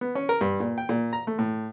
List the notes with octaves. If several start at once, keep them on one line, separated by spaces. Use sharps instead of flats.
B3
C#4
A#4
G2
A#2
G5
A#2
A#5
A3
A2